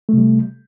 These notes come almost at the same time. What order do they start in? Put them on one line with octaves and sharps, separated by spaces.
A3 C3 G3